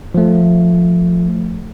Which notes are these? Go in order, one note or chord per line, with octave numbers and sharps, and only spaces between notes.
F3 A3